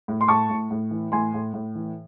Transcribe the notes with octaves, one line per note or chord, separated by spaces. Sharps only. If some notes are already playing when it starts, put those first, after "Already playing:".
A2
C6
A2 A5 C#6
A2
A2
E3
A2 G#5 C6
A2
A2
E3